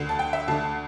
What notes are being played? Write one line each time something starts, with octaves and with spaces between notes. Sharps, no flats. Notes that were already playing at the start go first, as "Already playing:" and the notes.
Already playing: D2 D3
A5
G5
E5
D2 D3 A5